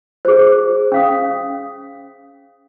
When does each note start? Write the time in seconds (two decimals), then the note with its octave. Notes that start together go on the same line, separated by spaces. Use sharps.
0.25 G#4 C5
0.92 C#4 F5 D#6